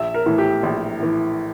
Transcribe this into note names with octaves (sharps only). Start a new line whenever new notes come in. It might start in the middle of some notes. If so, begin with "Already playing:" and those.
Already playing: A#1 E5
A#4
A2 E3
G4
A#1
A2 E3